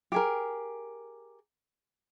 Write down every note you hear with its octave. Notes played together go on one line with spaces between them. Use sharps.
G4 G#4 A#4